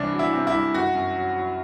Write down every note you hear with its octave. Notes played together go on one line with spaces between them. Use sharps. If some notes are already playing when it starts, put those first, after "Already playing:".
Already playing: C2 E3 D4
F#3
E4
C3
E4
C2
F#2 F#4
F#2
F#3
F#3